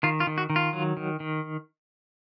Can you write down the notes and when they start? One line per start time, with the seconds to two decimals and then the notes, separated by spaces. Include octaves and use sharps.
0.03 D#3 F4
0.20 F4
0.27 D#3
0.38 F#4
0.50 D#3
0.56 F4
0.73 F#3
0.97 D#3
1.20 D#3